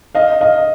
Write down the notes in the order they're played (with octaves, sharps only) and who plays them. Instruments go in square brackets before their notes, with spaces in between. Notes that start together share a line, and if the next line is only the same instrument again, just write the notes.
[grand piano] D#5 F5
D#5 F5